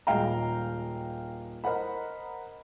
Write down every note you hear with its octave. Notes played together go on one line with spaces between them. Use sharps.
D#1 G#3 F5 G5 A#5
A#4 C5 D#5 F#5 B5